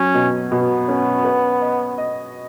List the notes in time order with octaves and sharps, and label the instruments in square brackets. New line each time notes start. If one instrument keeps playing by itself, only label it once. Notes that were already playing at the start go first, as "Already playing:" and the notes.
Already playing: [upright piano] F#3 [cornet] C#4
[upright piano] B2
[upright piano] B2 [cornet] B3
[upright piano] C#4
B4
D#5
D#5